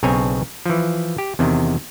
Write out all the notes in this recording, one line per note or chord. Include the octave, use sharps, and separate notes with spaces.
B1 C#3 C4 C#5 G#5
E3 F3
G4
E2 C3 D#3